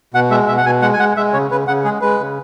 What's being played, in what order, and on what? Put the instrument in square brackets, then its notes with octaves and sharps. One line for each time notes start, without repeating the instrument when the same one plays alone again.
[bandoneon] B2 F#5
G#3 E5
B2 E5
F#5
B2 G#5
G#3 F#5
G#5
G#3 F#5
G#3 E5
C#3 C#5
C#3 B4
C#3 F#5
G#3 G#4
G#3 B4
C#3